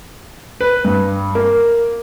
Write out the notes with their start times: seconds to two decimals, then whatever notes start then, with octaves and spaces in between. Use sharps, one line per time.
0.61 B4
0.85 G2
1.35 A#3